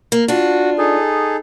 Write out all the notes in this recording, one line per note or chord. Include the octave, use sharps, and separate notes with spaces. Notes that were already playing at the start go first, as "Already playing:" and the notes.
A#3
D4 F4 F#4
D#4 G#4 A4